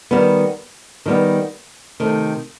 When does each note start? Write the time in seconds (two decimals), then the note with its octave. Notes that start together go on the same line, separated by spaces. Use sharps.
0.11 D#3 G3 B3
1.06 D#3 G3 B3
2.00 C3 D#3 A3